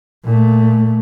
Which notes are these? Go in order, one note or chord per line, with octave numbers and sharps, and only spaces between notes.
A#2 A3